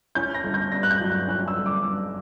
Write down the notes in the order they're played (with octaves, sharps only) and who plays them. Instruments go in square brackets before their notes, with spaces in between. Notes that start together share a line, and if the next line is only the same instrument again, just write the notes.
[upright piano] C#4 G6
A#6
G1
G6
G2 A#6
F#6
G6
F#3
F#6
C#4 F#6
E6
G1
D6
G2